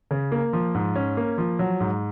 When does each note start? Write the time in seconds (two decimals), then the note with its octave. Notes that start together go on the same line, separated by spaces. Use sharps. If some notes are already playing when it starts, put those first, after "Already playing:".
0.11 C#3
0.32 A#3
0.53 F3
0.74 G#2
0.96 C#4
1.17 A#3
1.38 F3
1.59 F#3
1.80 G#2